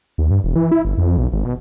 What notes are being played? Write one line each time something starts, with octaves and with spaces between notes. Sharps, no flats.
D#2
G2
E1
E3
E4
G1
F2
B1
G#1
B2